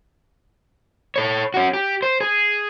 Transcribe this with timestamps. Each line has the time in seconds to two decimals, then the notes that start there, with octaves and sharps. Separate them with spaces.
1.16 A4 C#5
1.54 C#4 F#4
1.73 G4
2.02 C5
2.21 G#4